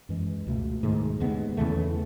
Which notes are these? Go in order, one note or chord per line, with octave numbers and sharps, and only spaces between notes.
F#2 E3 G#3
C#2 B2 A3
G#2 D#3 A3
D#2 C#3 G#3 B3
E2 C#3 E3 A3